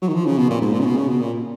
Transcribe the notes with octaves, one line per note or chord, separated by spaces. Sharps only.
F#3
D#3
F3
C#3
B2
A#2
G#2
A#2
C#3
B2
C#3
B2
A#2